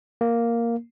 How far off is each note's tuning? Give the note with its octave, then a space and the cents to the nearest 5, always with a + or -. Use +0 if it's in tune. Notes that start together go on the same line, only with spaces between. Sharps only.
A#3 +0